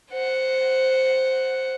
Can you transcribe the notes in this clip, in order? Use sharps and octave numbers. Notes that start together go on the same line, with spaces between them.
C5 F#5